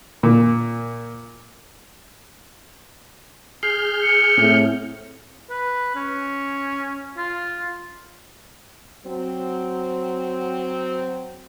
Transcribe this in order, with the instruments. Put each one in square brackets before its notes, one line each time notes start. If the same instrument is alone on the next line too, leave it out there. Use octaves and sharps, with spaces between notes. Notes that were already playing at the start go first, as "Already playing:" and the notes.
[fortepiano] A#2
[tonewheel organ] G#4 F6 G6 [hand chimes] C7
[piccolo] C#7
[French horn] A2 [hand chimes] C4
[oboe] B4
C#4
F4
[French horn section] F#3 C4